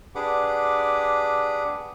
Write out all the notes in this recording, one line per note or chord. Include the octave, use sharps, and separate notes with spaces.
D4 G4 G#4 B4 F#5 D6